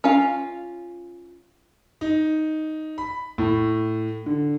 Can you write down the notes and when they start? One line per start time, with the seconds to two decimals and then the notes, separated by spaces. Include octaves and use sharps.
0.04 C#4 F4 F5
2.01 D#4
2.98 B5
3.38 A2
4.26 D3